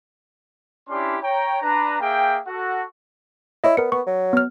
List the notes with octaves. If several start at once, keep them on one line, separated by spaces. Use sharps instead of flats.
C#4 D4 E4 G4 D5 C6
C#5 G5 A#5
D4 B4 A#5
A#3 G#4 E5 G5
F#4 A4 F#5
E4 C#5 D#5
B3 A#4 C#7
B3 C#6
F#3
B3 F6